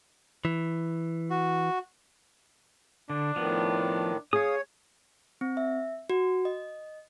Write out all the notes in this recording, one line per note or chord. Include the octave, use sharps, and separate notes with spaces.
E3
F#4
D3 D4
A2 D#3 F3 B3
G#4 C#5 F5 D#6
C4
E5
F#4
D#5